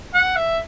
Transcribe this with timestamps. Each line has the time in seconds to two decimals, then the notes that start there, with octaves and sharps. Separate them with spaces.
0.14 F#5
0.36 E5